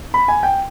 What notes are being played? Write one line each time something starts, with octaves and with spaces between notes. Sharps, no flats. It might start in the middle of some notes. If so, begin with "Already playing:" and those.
B5
G#5
G5